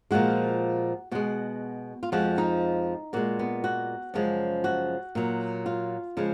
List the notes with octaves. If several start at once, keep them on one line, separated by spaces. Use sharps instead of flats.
A#2 F3 G#3 F#4
B2 G#3 F#4
F4
F2 F3 G#3 F#4
D#4
A#2 G#3 F#4
B3
F#4
F#2 C#3 F3 G#3
F#4
A#2 F#3
F4
C#3 F3 G#3